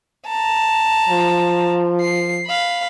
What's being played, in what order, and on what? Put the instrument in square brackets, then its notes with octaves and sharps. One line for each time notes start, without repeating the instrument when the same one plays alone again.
[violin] A5 A#5
[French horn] F3
[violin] C7
F5 B5